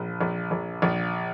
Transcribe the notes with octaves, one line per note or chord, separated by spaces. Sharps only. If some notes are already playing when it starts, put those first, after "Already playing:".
Already playing: A#1
A#1
A#1
A#1